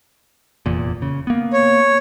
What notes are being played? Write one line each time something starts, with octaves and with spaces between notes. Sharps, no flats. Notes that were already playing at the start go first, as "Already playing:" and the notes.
F1 E2 A#2
C#3
A#3 B3
C#5